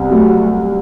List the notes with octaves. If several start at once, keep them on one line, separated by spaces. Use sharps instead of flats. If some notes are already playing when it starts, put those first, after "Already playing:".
Already playing: C2 C3 B3
F#3 A3